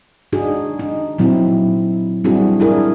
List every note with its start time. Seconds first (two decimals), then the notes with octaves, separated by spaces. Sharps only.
0.33 D4 D#4 F#4 G#4
0.79 D#4
1.18 A#2 F#3 C4 E4
2.24 G3 C4 D4 E4 F#4 G#4
2.60 D4 E4 G#4 A#4